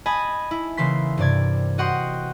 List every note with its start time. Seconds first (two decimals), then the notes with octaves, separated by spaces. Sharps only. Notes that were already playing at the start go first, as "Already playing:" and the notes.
0.06 D#5 G#5 A5 B5
0.51 E4
0.77 C#3 E3 A#3 C6 B6
1.17 G2 C3 D5 G#6
1.78 F#4 D#5 F#5 G5 C6